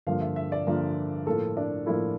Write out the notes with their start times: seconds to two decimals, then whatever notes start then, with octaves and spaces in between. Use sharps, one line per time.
0.07 G2 D3 F3 A#3 F5
0.21 E5
0.36 E5
0.52 D5
0.67 G2 D3 F3 A#3 A#4
1.26 A2 F3 A#3 A4
1.57 D4
1.86 A2 F3 A#3 E4